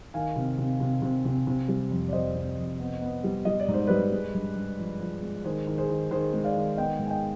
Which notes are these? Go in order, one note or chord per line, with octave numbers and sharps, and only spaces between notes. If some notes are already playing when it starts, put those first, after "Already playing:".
D#3 F5 G#5
C3
C3
C3
C3
C3
C3
G3
F2
D5
F2 C5 D#5
C3
F2
B3
B3
G3
G3 D#5
D5
G#2
C5
G3 B4 D5
G#3
G2
G2
F3
F3
G#3
D#3 G#4 C5
D#3
G#4 C5
D#3
D#3 G#4 C5
G#3
D5 F5
D#3
B3 D#5 G5
G#2
G#5
D#5 G5